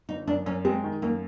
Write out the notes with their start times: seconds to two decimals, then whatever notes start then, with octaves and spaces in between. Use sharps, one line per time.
0.09 G1 D#4
0.27 F#2 D4
0.46 F#2 C#4
0.65 G#3 C4
0.84 D#3
1.02 F#2 A#3